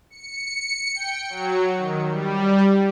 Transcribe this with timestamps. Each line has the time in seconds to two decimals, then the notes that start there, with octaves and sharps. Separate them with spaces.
0.10 C#7
0.95 G5
1.29 F#3
1.77 D#3
2.10 G3